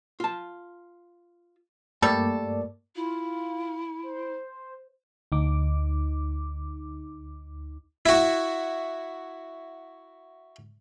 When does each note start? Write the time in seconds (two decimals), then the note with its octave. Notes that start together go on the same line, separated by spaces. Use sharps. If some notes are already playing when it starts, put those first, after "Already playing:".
0.20 F4 A5
2.02 G2 G3 A3 A#3 A4 D5
2.95 E4 F4
4.03 C5
5.32 D2 D#4 D6
8.06 E4 F#4